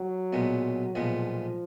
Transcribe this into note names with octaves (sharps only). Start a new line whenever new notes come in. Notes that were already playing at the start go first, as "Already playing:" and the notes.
Already playing: F#3
B1 A#2 G#3 B3
B1 A#2 F3 G#3 B3